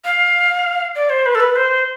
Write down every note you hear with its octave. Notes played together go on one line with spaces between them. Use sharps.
F5
D5
C5
B4
A4
B4
C5